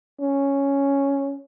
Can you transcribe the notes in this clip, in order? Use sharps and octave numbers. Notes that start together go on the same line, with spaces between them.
C#4